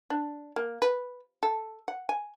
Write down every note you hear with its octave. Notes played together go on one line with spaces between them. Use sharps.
D4
A#3
B4
A4
F#5
G#5